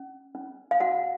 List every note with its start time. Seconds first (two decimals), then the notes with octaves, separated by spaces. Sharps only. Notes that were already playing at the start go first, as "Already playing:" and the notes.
Already playing: C#4
0.35 C#4
0.71 F5
0.80 F#4 F#5